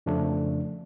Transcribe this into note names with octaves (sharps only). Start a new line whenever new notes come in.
F2 C#3 F3 A3 D4